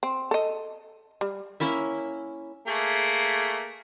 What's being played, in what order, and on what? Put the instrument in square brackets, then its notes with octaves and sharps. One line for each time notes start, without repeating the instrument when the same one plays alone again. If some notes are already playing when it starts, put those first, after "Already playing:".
[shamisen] C4
A4 D#5
G3
[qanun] A#3 C#4 E4 E5
[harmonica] A3 A#3 G#4